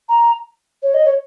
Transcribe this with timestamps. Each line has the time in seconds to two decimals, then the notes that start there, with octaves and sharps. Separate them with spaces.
0.09 A#5
0.83 C#5
0.94 D#5
1.05 C#5